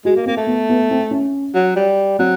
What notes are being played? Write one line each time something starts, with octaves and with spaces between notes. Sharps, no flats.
G#3 F#4
A#3
A#3 C4
A3
B3
B3
C4
C#4
F#3
G3
F#3 C4